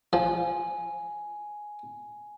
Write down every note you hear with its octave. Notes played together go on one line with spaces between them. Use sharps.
F3 G#5